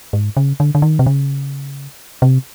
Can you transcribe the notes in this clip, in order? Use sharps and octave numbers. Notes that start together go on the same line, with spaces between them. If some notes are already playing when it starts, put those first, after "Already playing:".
G#2
C#3
D3
D3
D#3
C3
C#3
C3